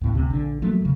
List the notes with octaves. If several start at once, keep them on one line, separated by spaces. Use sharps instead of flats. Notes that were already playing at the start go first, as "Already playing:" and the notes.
D#2 A2 B3
D2 C3
A#1 D3
F3 F#3 A3 A#3
A1 F2 C#3